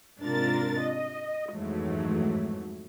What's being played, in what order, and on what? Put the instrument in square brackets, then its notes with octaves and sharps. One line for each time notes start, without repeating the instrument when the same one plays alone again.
[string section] G#2 C3 D4 F4 A#4 A6
D#5
F2 G#2 E3 F#3 A3